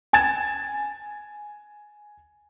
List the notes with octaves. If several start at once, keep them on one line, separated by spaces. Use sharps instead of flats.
G#5 G#6 A6 E7